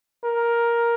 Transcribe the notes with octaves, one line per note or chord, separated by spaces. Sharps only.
A#4